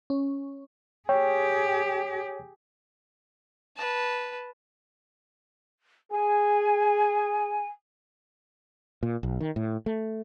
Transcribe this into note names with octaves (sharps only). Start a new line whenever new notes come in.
C#4
G4 G#4 C#5 G5
B4 A5
G#4 G#5
A#2
B1
D#3
A2
A3